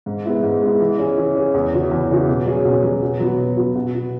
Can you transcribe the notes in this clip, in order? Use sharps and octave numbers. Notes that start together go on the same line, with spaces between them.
G#2
G#3 B3 E4
G#2
G#3 B3 E4
E3
C#4 G#4
E3
C#4 G#4
E2
C#3 E3 C#4 F#4
E2
C#3 E3 C#4 F#4
B2
F#3 C#4 G#4
B2
F#3 C#4 G#4
B2
F#3 B3 F#4
B2
F#3 B3 F#4
B2
B3 F#4